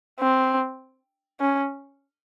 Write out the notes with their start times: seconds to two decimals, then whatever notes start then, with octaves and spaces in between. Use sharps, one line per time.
0.20 C4
1.40 C#4